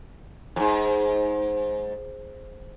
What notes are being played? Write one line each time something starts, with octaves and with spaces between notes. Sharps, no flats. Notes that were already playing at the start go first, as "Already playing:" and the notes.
F2 G#2